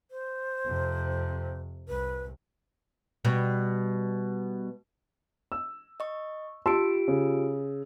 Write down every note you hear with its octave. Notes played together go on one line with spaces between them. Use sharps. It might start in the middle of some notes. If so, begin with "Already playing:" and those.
C5
F2 C3
C2 B4
B2 G3
E6
D#5 C#6
F4 G4 A5 C6 E6 D7
C#3